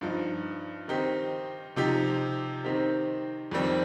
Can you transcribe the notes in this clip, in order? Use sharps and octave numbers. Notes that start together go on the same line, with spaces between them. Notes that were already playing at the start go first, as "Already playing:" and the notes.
G2 F3 D#4
D#3 C4 D#4 G4
C3 F3 D#4 G4
D#3 C4 D#4 G4
F2 D#3 G3 C4